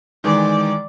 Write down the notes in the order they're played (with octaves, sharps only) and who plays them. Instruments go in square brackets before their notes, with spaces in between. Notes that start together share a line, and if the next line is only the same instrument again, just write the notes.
[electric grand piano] D#3 E3 G#3 [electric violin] D5